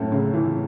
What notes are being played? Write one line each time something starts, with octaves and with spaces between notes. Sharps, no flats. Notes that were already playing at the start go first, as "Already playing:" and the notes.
Already playing: F#2 A2
C#3
E3